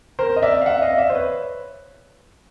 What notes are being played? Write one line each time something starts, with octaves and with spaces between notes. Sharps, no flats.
A#4 C5
D#5
D5 E5
F5
E5 F#5
D#5 F5
D5 E5
C5
B4 C#5